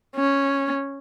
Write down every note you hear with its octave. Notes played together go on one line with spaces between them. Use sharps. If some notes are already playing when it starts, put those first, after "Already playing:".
C#4